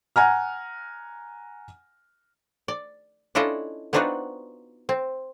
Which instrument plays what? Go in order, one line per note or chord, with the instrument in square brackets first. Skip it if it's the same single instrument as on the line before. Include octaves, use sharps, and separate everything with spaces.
[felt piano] F#5 G#5 A#5 F6
[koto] D5
C#4 D4 E4 F4 A4 D#5
B3 C4 D4 D#4 F4 F#4
C4